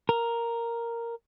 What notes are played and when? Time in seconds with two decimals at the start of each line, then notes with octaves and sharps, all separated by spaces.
0.09 A#4